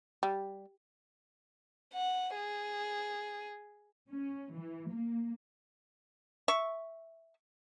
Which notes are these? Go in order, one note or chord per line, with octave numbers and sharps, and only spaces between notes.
G3
F#5
G#4
C#4
E3
A#3
E5 C#6